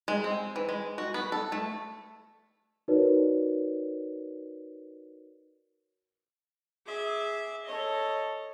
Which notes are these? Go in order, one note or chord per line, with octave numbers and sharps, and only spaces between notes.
G#3
C4
E3
G#3
F#4
B3
A4
A3
D#4 F#4 A#4 B4 C#5 D5
G#4 E5 D6
A4 C#5 D#5